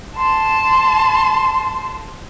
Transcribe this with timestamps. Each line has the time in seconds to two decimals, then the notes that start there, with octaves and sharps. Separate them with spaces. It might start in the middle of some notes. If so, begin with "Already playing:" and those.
0.16 A5 C6